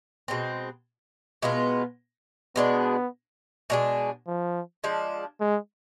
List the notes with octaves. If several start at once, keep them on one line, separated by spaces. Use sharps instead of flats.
B2 G#3 C4
B2 G#3 B3 F4
B2 G#3 B3 D4
B2 G#3 D4 G#4
F3
F3 G#3 D4
G#3